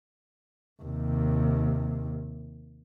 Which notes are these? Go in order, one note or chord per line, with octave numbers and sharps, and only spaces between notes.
D#2 C3